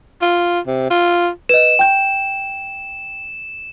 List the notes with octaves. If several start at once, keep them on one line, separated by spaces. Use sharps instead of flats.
F4
C3
F4
B4 D#5 E7
G5 G6